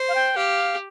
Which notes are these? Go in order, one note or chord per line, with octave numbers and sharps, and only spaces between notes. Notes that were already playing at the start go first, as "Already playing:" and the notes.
Already playing: C5
F5
G5
G4 F5